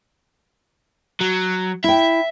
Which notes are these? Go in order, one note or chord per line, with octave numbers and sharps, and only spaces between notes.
F#3
E4 E5 G5